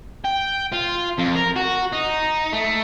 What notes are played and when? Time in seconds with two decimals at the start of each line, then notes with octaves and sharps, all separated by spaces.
0.24 G5
0.72 F4
1.18 F2
1.36 A#4
1.56 F#4
1.93 D#4
2.53 A3